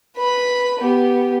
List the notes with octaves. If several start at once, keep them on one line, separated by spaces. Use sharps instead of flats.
B4 B5
B3 G4